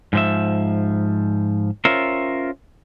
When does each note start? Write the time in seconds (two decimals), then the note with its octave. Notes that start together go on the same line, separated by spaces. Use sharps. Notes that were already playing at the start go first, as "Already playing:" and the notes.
0.13 G#2 F3 E5
1.85 C#4 F4 A#4 C5 E5